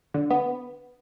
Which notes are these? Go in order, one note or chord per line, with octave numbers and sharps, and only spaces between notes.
D3
B3